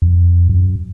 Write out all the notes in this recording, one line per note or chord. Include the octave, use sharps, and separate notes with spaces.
F2
F#2